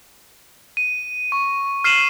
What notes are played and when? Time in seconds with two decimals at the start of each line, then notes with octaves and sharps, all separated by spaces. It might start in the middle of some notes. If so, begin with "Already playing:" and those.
0.77 D#7
1.32 C#6
1.84 F6 C7 D#7 E7 F#7